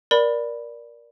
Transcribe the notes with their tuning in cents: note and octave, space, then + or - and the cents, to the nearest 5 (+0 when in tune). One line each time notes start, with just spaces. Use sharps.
A#4 +20 D5 +0 B5 +0